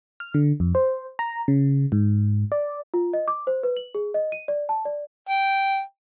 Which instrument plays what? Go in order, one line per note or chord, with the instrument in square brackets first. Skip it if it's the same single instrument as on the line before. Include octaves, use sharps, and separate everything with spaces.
[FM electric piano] F6
D3
F2
C5
A#5
C#3
G#2
D5
[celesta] F4
D#5
D6
C5
B4
F#7
G#4
D#5
D#7
D5
A5
D5
[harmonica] G5